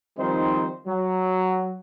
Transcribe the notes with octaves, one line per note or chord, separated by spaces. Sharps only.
D#3 F3 G3 C4 D#4 C5
F#3